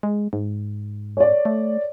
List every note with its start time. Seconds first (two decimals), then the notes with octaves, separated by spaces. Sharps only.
0.03 G#3
0.33 G#2
1.17 C#5 D5
1.45 A3